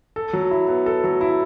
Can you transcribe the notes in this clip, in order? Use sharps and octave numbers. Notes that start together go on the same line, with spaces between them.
A4
F#3
E4
B3
A4
F#3
E4